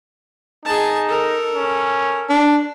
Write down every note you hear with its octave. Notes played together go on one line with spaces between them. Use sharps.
D#4 G#4 A5
A4 A#4
C#4
D4